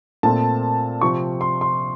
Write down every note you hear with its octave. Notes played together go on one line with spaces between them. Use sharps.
A#2 A3 C4 A5
C3 F3 C4 C#6
C6
C6